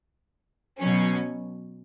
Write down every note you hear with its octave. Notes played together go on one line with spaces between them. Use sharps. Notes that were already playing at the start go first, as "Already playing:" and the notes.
B2 F#3 C#4